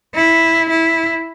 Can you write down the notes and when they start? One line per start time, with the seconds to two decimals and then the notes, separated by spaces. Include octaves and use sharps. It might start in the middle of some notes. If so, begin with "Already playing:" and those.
0.16 E4
0.70 E4